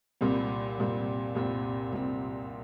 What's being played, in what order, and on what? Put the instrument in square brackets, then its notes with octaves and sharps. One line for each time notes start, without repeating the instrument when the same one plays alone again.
[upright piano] C2 A#2 G3 C4
C2 A#2 G3 C4
C2 A#2 G3 C4
C2 A#2 G3 C4